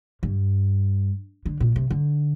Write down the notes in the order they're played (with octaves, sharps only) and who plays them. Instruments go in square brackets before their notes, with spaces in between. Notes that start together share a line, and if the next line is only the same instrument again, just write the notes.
[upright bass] G2
D3
A#2
C3
D3